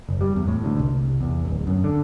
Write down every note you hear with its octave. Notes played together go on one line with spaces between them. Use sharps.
F#1
G3
E2
A2
D2
C2
E2
D1
F#2
D3